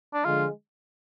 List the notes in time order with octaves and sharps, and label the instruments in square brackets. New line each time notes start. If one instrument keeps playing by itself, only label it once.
[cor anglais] D4
[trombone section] D3 F3 G#3 [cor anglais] F4